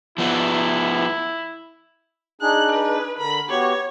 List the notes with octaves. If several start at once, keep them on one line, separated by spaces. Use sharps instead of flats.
F3 B3 E4
D4 D#4 G#4 F#6
B4
D3 A#4 B5
B3 F#4 G4 C#5